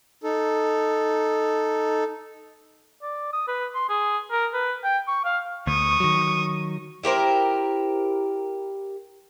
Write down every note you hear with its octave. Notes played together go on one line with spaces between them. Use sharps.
D#4 A4
D5
D#6
B4
C6
G#4
A#4
B4
G5
C#6
F5
D2 C#6 D#6
D#3 F#3
E4 G4 A#4 C5